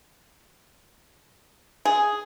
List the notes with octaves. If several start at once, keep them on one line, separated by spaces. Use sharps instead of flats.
G#4